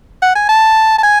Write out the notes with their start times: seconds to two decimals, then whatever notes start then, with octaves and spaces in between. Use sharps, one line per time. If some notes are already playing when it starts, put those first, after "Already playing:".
0.22 F#5
0.35 G#5
0.49 A5
0.98 A5
1.03 G#5